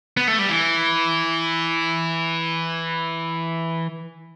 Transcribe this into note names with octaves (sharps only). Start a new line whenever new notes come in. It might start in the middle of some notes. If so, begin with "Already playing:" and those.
B3
A3
G3
E3